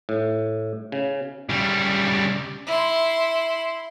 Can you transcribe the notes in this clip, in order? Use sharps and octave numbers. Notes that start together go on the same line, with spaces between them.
A2
C#3
C#3 G3
E4 C6